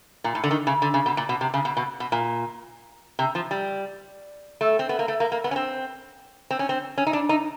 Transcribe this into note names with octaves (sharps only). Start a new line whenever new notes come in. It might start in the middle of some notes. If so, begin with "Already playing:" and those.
A#2
A2
D3
D#3
C#3
D3
C#3
B2
A#2
B2
C3
C#3
B2
B2
B2
A#2
C3
F3
G3
A3
C4
B3
A#3
A3
A#3
A#3
B3
C#4
C4
C4
C#4
C4
C#4
D#4
D4
D#4